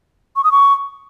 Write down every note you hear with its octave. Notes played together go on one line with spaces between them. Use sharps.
C#6
D#6
C#6